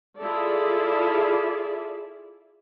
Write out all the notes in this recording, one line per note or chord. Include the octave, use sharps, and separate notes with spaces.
E4 F4 G#4 A4 D5 E5